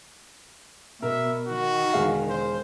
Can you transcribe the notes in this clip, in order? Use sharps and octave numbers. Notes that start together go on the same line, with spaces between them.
B2 A#4 E5
D#3 F#4
E1 G#4 F5
C5